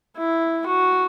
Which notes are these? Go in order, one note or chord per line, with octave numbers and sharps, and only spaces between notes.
E4
F#4